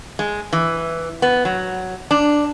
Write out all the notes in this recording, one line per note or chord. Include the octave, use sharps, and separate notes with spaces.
G#3
E3
B3
F#3
D4